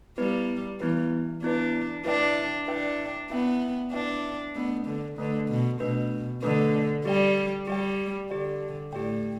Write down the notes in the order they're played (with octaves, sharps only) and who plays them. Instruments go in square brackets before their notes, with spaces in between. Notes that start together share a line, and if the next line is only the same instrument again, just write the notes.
[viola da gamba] G3 [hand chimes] B3 E4 B4
[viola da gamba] E3 [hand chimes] B3 E4 B4
[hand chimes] B3 E4 B4 [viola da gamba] D4
[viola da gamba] D4 [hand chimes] E4 B4 E5 G5
[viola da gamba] D4 [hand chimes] E4 B4 E5 G5
[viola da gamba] B3 [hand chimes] E4 B4 E5 G5
[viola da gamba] D4 [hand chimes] E4 B4 E5 G5
[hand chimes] A3 D4 B4 [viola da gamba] B3
[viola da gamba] D3
[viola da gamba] D3 [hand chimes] A3 D4 B4
[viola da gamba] B2
[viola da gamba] B2 [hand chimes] A3 D4 B4
[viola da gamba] D3 [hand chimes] A3 D4 B4
[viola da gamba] G3 [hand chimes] G4 D5 G5
[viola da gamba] G3 [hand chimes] G4 D5 G5
[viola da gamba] D3 [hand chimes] G4 D5 G5
[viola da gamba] A2 [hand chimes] G4 D5 G5